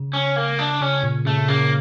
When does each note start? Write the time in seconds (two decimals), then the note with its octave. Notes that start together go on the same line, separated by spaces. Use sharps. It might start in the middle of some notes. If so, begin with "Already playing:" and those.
Already playing: C#3
0.13 C#4
0.36 A#3
0.59 D4
0.81 C#3 C#4
1.03 A#2
1.26 C#3 A3
1.48 C#3 A#3